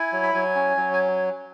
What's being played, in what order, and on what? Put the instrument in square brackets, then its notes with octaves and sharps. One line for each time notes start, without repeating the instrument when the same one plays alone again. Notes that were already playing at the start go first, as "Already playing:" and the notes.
Already playing: [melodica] E4 G#5
F#3
B5
F#3 G#5
C#4
F#3
G#5